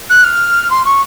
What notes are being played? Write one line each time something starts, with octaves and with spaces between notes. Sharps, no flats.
F#6
F6
C6
C#6